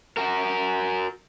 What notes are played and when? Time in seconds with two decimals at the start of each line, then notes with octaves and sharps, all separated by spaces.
0.17 F#4 A#4